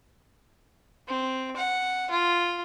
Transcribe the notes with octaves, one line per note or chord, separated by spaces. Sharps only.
C4
F#5
F4